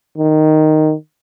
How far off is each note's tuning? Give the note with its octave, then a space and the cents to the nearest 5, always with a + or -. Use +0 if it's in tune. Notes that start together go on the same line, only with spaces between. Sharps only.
D#3 -5